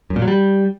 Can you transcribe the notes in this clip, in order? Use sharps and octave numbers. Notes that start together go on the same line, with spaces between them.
F#2
A#2
F#3
G3